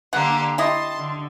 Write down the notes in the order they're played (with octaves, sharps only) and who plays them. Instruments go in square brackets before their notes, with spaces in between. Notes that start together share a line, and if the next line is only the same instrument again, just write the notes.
[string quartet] D3 A#3 G4 [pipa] F#5
[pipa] E4 G4 D#5 [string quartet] A5 C6
[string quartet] D3